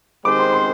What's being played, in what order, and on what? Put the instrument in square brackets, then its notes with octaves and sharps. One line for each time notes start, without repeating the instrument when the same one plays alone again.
[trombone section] D#3 G#3 C4 G4 C5 [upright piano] D6
[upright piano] C6
C6